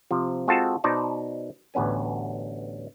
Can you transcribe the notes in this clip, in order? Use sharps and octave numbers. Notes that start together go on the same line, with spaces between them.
C3 F3
G#3 C4 F4 F#4 A4 A5
B2 D#4 C5 D5 A5
A1 D2 B3 C#4 G#5